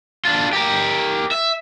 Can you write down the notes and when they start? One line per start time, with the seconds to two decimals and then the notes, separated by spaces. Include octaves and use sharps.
0.25 D4 F4
0.53 G4 A#4
1.31 E5